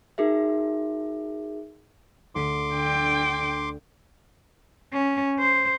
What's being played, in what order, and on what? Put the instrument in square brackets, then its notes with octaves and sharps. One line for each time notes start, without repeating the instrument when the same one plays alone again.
[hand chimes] D#4 F#4 G#4 A#4 E5
[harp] D2 B6 D#7 [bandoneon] C6 D6
[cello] D3 G5
C#4
C5